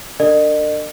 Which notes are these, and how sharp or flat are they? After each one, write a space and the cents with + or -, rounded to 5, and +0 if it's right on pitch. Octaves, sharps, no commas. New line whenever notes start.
D4 +0 A#4 -40 D#5 -45